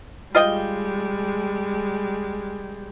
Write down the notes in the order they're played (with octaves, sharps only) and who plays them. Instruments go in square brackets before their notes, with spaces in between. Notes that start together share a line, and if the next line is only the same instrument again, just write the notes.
[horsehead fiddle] G3 G#3 [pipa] F4 D#5 G5